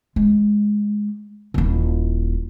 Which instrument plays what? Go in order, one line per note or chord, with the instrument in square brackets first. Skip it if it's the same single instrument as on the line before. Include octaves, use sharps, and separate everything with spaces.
[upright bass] G#3
D#1 E4